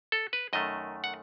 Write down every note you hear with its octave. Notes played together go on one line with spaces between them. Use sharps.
A4
B4
F#2 D#3 A3 D#5
F#5